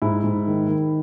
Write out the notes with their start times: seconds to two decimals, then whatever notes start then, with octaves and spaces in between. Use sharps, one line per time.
0.02 G#2 E4
0.24 G#2
0.47 D#3
0.69 D#3